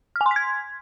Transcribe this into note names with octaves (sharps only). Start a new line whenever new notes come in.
F6
G#5
C6
B6
G#6